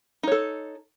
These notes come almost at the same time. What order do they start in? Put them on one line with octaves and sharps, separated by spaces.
D#4 C#5 A4